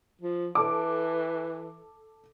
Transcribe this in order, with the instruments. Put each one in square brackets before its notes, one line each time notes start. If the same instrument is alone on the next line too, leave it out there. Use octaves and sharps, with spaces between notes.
[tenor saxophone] F3
[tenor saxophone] E3 [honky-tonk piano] A4 D6